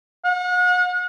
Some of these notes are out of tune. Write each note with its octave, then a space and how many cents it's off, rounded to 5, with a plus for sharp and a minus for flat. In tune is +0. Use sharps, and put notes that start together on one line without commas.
F#5 -40